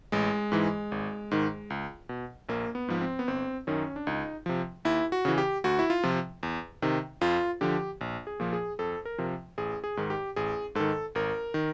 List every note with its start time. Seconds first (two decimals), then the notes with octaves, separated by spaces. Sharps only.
0.12 A1 G#3
0.52 G#2 E3
0.92 G#1
1.31 G#2 D#3
1.70 C#2
2.09 B2
2.49 A#1 A#3
2.75 B3
2.88 G#2 F3
3.01 C4
3.19 B3
3.27 G1 C4
3.67 F#2 D#3 C#4
3.96 D4
4.07 C#2 D#4
4.46 C3 F3
4.85 D#2 E4
5.12 F#4
5.25 C#3 E3
5.38 G4
5.64 D2 F#4
5.79 E4
5.90 F4
6.03 C3 F3
6.43 E2
6.82 C3 D#3
7.21 F2 F4
7.61 D3 F3 G4
8.01 A#1
8.27 G#4
8.40 A#2 F3
8.53 G#4
8.79 F2 A4
9.05 A#4
9.18 C3 F3
9.58 A1 G#4
9.84 G#4
9.97 G#2 D#3
10.10 G4
10.36 A1 G#4
10.75 G#2 D#3 A4
11.15 G#1 A#4
11.54 D#3